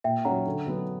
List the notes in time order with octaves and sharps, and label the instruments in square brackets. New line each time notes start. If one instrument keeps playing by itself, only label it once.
[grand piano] A#2 [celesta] E5 G5
[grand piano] F#3 C#4 [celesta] F#5 A#5
[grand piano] D3
F#3 B3 D4